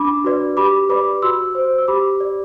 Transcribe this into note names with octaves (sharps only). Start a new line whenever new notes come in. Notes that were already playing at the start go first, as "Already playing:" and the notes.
Already playing: D4 B5 D6
F#4 B4 D5
G4 B5 D6
B4 D5 B5 D6
F#4 C6 E6
C5
E6
G4 B5 D6
D5